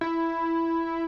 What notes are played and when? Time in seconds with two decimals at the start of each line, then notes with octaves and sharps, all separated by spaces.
0.01 E4